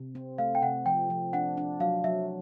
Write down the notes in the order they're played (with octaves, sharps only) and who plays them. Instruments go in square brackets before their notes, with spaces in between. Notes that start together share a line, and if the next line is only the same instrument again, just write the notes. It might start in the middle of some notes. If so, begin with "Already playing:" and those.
Already playing: [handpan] C3
C4
[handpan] A3 [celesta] F5
[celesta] G5
[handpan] C3 [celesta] F#5
[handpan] F3 [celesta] G5
[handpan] F3
[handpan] D4 [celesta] F#5
[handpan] D4
[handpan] F#3 [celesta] F5
[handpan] F#3 [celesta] E5